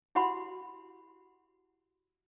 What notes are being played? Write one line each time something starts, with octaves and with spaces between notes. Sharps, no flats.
E4 F#4 G4 F#5 B5 C6